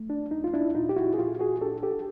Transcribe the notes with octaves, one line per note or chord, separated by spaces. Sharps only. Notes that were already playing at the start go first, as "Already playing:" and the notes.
Already playing: A3
D4
D#2 D#4
F4
D4 E4
A#2 D#4 F4
G4
E4 F#4
G#4
A#2 F4 G4
F#4 G#4
D4 G4 A4
G4 A4